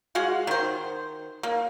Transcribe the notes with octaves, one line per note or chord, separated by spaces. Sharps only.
G#3 F#4 F5 F#5
D#3 C5
A#3